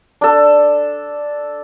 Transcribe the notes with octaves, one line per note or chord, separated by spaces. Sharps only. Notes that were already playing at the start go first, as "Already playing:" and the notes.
D4 A4